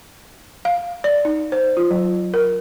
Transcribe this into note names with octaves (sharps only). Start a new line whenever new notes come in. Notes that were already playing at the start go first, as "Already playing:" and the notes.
F5
D5
D#4
C5
F4
F#3
A#4